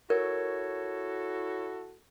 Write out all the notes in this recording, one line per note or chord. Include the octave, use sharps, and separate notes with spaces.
E4 F#4 A4 A#4 C#5